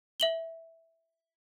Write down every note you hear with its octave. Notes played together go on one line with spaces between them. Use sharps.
E5 F#7 G7